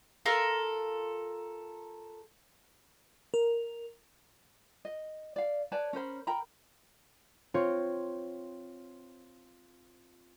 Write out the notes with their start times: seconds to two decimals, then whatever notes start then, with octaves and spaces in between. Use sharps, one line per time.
0.25 F4 A4 A#4
3.34 A#4
4.85 D#5
5.36 D5 F5
5.72 B4 C#5 D5 A5
5.93 C#4 A#4 C5 B5
6.27 A#4 G5 A#5 B5
7.54 C4 F4 C#5